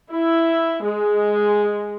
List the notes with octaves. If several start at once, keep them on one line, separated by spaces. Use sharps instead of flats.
E4
G#3